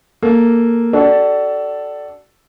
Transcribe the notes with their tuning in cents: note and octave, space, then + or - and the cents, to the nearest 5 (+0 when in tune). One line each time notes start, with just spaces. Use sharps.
A#3 +0 A4 +0
D4 +0 F#4 +40 A4 +0